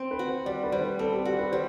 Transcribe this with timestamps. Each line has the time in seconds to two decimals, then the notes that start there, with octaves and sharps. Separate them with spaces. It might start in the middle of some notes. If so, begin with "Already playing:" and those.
Already playing: C4
0.11 B4
0.19 F#4
0.28 C5
0.46 G3 D5
0.64 B4
0.72 G3 C5
0.81 B4
0.99 C4 A4
1.12 G4
1.25 F#4 G4
1.38 B4
1.52 G3 C5